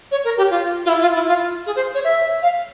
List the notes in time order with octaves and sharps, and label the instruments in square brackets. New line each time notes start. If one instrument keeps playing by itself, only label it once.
[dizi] C#5
A#4
G4
F4
F4
E4
F4
E4
F4
G#4
C5
C#5
E5
F5